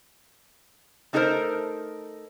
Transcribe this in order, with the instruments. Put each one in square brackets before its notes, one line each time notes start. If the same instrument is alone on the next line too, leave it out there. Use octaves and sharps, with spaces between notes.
[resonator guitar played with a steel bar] A3 D#4 F#4 A4 A#4 C5